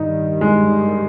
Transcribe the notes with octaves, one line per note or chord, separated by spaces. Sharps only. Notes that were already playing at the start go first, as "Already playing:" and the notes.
Already playing: G2 D#3 G3 D#4
G#3